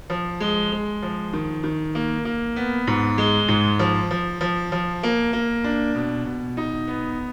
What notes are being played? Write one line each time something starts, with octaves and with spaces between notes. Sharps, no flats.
F3
G#3
G#3
F3
D#3
D#3
A#3
A#3
B3
G#2
G#3
G#2
F3
F3
F3
F3
A#3
A#3
D4
B2
B2
D#4
B3